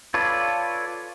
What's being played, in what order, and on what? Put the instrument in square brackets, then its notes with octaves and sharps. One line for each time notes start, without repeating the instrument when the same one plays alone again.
[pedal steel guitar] F4 A4 B4 C#5 D5